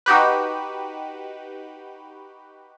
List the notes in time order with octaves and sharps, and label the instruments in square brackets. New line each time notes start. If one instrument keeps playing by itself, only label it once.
[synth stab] D#4 F#4 G4 B4